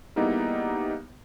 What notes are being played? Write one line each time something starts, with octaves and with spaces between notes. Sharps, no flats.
G3 A#3 B3 D#4 E4 G#4